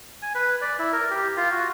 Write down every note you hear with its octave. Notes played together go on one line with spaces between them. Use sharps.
G#5
B4
D5
E4
A#4
G4
F4
F#4